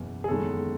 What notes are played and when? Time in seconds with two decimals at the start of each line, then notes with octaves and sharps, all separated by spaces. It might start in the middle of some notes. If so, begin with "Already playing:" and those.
Already playing: F#1 E2 B2
0.24 G#4
0.28 F#1 E2 D#3 G#3 A4